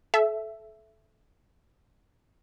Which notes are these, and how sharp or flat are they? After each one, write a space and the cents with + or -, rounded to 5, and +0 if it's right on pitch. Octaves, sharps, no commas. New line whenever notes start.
A4 -25 E5 +10